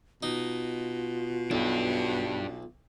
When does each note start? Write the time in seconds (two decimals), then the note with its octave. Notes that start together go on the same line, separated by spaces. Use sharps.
0.23 B2 D#4 F4
1.51 B1 D4 G4